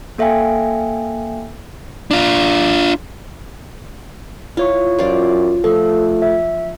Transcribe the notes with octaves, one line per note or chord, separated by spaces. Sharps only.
A#3 A4 E5 F5 G5 G#5
D4 F4
E4 F4 C#5 C#6
F#2 F4 C5 D5
F3 A3 A4
E5